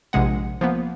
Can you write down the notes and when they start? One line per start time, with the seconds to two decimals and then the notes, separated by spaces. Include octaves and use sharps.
0.13 A#1 C3 G#3 F#5
0.61 F3 A#3 B3